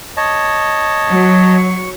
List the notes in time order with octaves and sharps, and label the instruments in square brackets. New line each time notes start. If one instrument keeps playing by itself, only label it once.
[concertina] C#5 D#5 A5
[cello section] F#3
[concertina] C#6